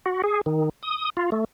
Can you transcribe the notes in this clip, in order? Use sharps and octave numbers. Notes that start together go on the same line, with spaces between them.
F#4
G#4
D#3
D#6
F4
A3